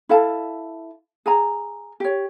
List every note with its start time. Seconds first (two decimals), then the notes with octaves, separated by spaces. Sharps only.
0.09 E4 A4 F5 A5
1.26 G#4 G#5 A#5
2.00 G4 C#5